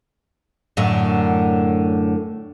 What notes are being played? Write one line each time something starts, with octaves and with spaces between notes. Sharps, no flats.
F#2 A2 D3